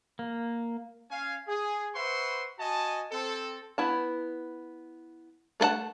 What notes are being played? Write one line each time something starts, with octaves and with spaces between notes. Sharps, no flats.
A#3
C#4 F5 G#5
G#4
B4 C5 E5 F#5 C6 C#6
F#4 D#5 G#5 A5
C4 A4
B3 E4 A5
A3 A4 B4 F#5 A5